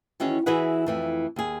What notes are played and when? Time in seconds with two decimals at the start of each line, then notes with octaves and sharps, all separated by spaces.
0.20 D#3 E3 C#4 F#4 G#4
0.46 E3 E4 F#4 G#4 B4 F#5
0.86 F2 E3 A3
1.36 D#2 G#4